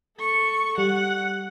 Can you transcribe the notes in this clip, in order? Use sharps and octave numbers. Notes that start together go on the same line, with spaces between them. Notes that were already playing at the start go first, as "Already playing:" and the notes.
A4 C#6
G3 F#5